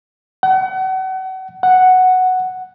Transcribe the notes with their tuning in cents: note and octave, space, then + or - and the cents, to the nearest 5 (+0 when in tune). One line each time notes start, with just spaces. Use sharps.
F#5 +35
F#5 +0